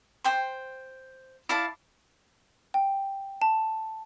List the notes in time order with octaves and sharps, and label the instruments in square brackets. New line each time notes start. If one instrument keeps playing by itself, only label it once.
[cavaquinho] C5 G5 C6
E4 D5 F5 A5
[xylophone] G5
A5